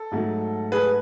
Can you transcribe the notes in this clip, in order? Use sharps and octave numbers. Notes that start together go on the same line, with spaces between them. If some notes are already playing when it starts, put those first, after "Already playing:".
Already playing: A4
G#2 F#3 A3
G#4 B4